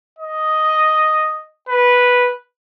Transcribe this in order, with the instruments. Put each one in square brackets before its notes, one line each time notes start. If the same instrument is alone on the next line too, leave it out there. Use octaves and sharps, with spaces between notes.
[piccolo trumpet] D#5
B4